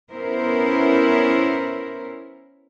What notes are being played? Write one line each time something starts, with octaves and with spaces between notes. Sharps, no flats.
B3 C#4 E4 A#4 C5